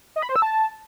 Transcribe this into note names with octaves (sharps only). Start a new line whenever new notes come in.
D#5
B5
C5
E6
A5